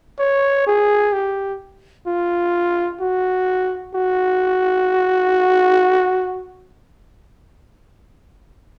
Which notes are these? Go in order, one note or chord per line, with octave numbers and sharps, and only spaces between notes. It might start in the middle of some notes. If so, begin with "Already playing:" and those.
C#5
G#4
G4
F4
F#4
F#4